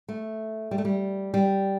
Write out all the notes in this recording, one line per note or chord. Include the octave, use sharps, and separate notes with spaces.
A3
G3
A3
G3
G3